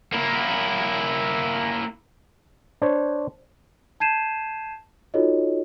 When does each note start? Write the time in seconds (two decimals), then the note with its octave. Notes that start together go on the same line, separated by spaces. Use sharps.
0.13 A#3 E4
2.82 D4 C5 C#5
4.00 A5 G6 G#6 C7 D#7 E7
5.14 D#4 F4 F#4 A4 C#5 D#5